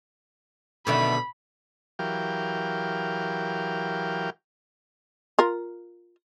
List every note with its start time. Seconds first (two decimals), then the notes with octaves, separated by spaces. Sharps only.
0.87 F#2 B2 D3 D#3 A3 D4 B5
1.99 E3 F#3 G4 A#4 F5 G5
5.39 F4 A#4